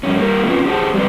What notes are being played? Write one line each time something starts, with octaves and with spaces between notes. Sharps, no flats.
G2 C#4
G3 A#3
A3 A#3 C4 C#4 F4 B4
G4 G#4 C5 D#5 A5
G3 G#3 C4 B4 D5